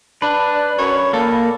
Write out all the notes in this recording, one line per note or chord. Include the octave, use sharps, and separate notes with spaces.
D4 B4
D5
F#2 C#5 B5
A#2 A#3 A4